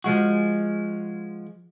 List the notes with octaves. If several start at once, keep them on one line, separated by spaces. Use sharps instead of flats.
F3 G#3 F#4